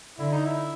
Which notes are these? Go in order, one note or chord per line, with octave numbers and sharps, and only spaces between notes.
D3 E4
D#4
E4